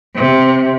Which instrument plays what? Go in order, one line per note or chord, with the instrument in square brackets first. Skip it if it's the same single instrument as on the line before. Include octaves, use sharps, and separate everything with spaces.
[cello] C3